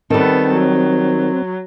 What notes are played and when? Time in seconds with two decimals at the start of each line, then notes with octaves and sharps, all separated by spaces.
0.10 D#3 G3 B3 C4 A4
0.52 F#3